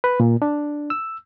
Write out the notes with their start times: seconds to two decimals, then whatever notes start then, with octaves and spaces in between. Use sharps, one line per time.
0.04 B4
0.20 A#2
0.42 D4
0.90 E6